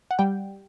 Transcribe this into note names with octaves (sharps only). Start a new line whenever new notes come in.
F#5
G3 G5